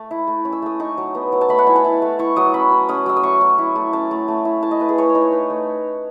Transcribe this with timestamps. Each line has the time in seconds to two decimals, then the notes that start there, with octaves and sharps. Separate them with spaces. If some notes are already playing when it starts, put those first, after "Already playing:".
Already playing: A3 C#6
0.11 E4
0.27 A3
0.45 C#4
0.52 E6
0.62 A3 D#6
0.80 D#4 C#6
0.98 F#3
1.15 B3
1.32 F#3
1.41 A5
1.49 A3 B5
1.59 F#5
1.67 E4 G#5
1.76 A5
1.85 E4
2.02 A3
2.19 E4 C#6
2.36 F#3 D#6
2.54 C#4 B5
2.72 F#3
2.89 C#4 D#6
3.06 F#3 E6
3.17 D#6
3.23 A3 C#6
3.41 F#3
3.58 E4
3.76 A3
3.93 C#4 A5
4.11 A3
4.28 A3
4.45 E4
4.63 E4 A5
4.71 D#5
4.80 A3 B4
4.89 G#4
4.98 A3 C#5
5.09 C#5
5.15 D#4
5.22 C#5
5.32 D#4 B4
5.50 A3